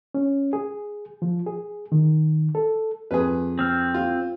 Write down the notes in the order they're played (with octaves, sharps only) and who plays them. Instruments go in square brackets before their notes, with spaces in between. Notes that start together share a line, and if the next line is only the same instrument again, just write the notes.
[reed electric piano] C#4
G#4
F3
G#4
D#3
A4
[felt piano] F2 [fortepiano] G#4 B4
[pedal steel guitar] C4 F6
[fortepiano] F4